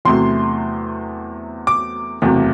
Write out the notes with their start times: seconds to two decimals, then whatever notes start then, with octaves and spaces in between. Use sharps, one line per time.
0.05 E2 C3 F#3 A3 C6
1.67 D6
2.22 F#1 E2 C3 F#3 A3